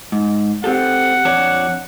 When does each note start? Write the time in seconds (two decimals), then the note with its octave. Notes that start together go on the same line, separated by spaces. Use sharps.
0.12 G#2
0.64 C4 G4 A4 F#5
1.25 F2 D4 C#5